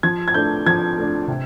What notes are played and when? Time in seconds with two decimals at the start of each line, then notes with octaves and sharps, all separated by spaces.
0.03 F3 G#6
0.28 G#6
0.34 A3 D4 G6
0.66 F3 G#6
0.98 A3 D4
1.28 C3